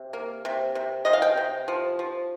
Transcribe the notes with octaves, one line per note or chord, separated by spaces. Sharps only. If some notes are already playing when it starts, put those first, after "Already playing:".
Already playing: C3
A#3
C3
C3
C3 D#5
F5
G5
C3
F3
F3